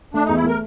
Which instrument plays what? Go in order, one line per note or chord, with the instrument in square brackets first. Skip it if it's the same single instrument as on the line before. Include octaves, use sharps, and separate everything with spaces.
[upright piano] A3 [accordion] D4
[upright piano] E2 [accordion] D#4
[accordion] E4
[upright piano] A3 [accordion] A#4